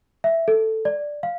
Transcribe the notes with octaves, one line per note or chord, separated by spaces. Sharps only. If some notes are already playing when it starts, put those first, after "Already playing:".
E5
A4
D5
F5